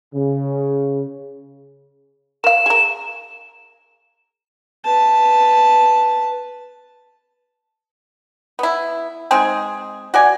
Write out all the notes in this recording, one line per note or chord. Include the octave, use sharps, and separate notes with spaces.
C#3
A#4 F5 E7
G#4 A#4
B4 A5
B3 E4
G#3 C4 D#4 G#4
F#4 D5 G#5